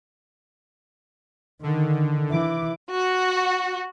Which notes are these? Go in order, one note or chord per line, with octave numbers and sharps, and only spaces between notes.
D3 D#3
E3 E4 D6
F#4